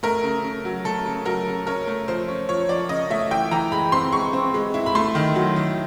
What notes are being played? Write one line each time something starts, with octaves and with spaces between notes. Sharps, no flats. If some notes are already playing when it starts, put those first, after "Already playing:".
A3 A#4
C#3
C#3
F#3
A3 A4
C#3
F#3 A#4
C#3
C#4 A#4
A3
F3 C5
C#4
F3 C#5
F3 D5
C#3 D#5
A3 E5
E3 G5
E3 A#5
G#3 B5
C4 C6
G#3 C#6
C4
G#3
E4
B5
A3 C6
D#3
F#3
D#3